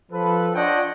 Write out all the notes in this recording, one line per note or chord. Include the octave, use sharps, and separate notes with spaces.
F3 A4 B4
D4 F4 C#5 D#5 F#5 G5